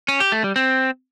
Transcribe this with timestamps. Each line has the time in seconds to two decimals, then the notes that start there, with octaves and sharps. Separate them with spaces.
0.08 C#4
0.20 G4
0.32 A3
0.44 G3
0.56 C4